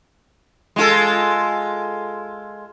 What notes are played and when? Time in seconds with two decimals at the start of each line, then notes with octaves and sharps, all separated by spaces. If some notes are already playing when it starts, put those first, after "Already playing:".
0.76 G#3 F4 A4